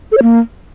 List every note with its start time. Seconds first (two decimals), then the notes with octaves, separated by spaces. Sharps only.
0.12 A4
0.17 C#5
0.23 A#3